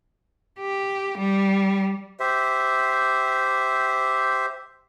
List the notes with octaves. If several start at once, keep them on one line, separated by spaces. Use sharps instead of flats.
G4
G3
G4 C5 E5